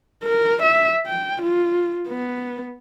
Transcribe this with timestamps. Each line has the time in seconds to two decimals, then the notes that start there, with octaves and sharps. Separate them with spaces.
0.24 A#4
0.63 E5
1.07 G5
1.43 F4
2.08 B3